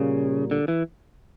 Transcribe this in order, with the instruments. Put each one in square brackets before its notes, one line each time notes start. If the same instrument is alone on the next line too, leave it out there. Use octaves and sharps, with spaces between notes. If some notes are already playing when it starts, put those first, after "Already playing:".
Already playing: [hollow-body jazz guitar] A#2 G3 A#3 [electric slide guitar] C#3
[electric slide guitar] D3
E3